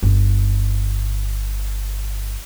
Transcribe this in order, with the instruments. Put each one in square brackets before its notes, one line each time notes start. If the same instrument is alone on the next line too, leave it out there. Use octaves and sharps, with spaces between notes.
[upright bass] G1 D#4